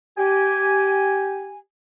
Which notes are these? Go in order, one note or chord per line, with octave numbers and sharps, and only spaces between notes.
G4 G#5